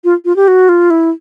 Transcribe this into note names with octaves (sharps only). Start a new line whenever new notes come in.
F4
F4
G4
F#4
F4
E4